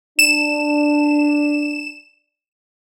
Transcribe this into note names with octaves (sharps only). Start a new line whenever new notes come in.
D4 E7